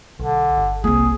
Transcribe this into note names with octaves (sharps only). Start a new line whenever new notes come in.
B1 D3
G1
C2 A#3 G#4